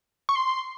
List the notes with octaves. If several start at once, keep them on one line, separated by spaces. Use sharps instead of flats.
C#6
C6